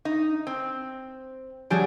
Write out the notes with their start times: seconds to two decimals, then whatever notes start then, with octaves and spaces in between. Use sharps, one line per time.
0.05 D#4
0.47 C4
1.70 F#3 G3 D4 G4 G#4